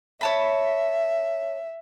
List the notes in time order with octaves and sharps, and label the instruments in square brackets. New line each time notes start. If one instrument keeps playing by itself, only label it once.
[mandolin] C#5 A5 B5 [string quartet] E5